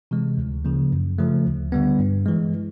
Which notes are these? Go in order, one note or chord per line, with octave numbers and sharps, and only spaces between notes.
C3 E3 G#3
D2
C#3 F3 A#3
F#2
C#3 F3 A3
D2
D3 G3 B3
G2
E3 G#3